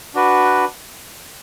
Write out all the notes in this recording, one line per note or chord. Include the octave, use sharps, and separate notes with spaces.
D4 F#4 B4